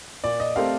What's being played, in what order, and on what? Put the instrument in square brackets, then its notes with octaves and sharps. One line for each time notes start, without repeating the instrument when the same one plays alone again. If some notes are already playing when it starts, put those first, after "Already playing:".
[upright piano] A#2 [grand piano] D5
[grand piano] D#5
[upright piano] A3 C4 G4 A#4 [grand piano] F5